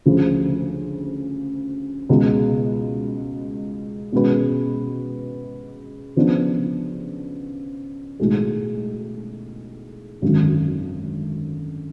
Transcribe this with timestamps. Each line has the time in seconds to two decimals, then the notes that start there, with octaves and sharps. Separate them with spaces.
0.06 D2 C#3 F3
2.09 C#2 B2 G#3
4.12 B2 G#3 C#4 F#4 B4
6.16 C#3 F3 B3 D4
8.20 B1 A2 G#3
10.22 G#1 F#2 D3 F#3